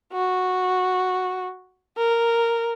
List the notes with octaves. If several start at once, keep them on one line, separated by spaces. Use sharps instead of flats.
F#4
A#4